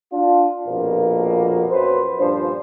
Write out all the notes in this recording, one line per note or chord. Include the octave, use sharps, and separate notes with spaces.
D4 F4
A#1 F2 B2 F3 A#3
F#2 B4 C5
G2 A#2 F3 D4 C5